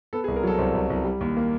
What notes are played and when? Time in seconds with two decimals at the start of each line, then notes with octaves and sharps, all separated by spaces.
0.13 B3 A4
0.24 G#4
0.28 C2
0.36 A#4
0.43 F#3 A4
0.58 C2 C5
0.74 C2
0.90 C2
1.05 G3
1.21 D#2
1.37 A#3